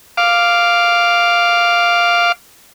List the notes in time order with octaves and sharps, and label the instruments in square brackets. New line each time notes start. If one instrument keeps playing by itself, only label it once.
[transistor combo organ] F5 D6